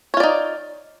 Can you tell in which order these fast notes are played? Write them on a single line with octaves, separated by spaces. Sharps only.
C#5 F4 D5 D#4